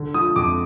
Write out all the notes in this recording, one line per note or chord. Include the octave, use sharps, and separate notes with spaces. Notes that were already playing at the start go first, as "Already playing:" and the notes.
Already playing: D3
F3 D#6
F2 D6